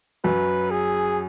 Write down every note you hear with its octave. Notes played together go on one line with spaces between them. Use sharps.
F#2 F#3 B4
G#4